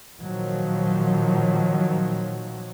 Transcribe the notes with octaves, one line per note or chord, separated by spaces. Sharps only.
A#2 D#3 F3 F#3